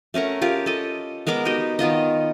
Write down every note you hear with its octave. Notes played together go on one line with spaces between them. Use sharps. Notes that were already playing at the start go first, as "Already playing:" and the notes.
A3 C#4 A#4 F#5
F4 G4 G#4 A#4
A4 D#5
G#3 B3 A#4 D6
D#4 F#4 G4 D#5
D#3 B3 F4 D#5